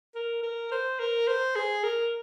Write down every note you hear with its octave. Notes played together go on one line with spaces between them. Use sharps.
A#4
A#4
C5
A#4
C5
G#4
A#4